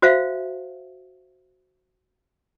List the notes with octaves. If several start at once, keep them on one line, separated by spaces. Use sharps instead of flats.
F#4 C5 E5 F5